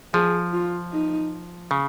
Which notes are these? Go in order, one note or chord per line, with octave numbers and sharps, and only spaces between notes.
F3 G#4
F4
D#4
C#3